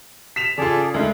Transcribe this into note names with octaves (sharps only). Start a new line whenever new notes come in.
B6 E7 F7
C#3 F4 G#4 A4 D5
D2 C#3 G#3 D#4